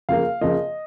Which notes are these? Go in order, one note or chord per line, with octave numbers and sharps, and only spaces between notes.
C#3 F3 A#3 F5
C#3 F3 A#3 D#5